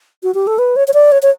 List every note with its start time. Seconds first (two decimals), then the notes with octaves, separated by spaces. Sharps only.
0.23 F#4
0.34 G4
0.47 A4
0.58 B4
0.76 C#5
0.88 C#5
0.94 D5
1.12 C#5
1.22 C#5